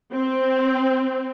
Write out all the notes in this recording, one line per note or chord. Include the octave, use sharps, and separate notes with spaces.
C4